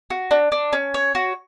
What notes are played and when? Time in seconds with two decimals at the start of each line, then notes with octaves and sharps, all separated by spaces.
0.10 F#4
0.31 D4
0.52 D4
0.73 C#4
0.94 C#5
1.15 F#4